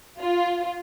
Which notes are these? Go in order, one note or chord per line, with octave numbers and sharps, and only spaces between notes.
F4